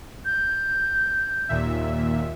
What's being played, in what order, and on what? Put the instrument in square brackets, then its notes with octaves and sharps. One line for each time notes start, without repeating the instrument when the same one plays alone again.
[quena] G6
[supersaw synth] D#2 A#2 E5